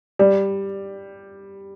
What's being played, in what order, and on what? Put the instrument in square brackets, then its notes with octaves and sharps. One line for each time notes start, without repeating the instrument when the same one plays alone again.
[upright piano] G3